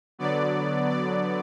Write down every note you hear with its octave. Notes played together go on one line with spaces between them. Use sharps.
D3 F#3 B3 D5
D5